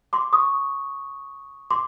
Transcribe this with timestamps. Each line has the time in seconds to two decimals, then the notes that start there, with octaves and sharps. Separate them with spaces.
0.13 C6 D6
0.33 C#6 D#6
1.71 C6 D6